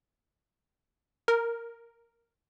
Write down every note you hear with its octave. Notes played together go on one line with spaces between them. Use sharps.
A#4